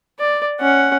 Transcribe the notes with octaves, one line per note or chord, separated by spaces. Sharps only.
D5
C#4 F#5